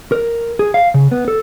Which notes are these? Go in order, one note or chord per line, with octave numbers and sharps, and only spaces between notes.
A#4
G#4
F5
C#3
B3
A4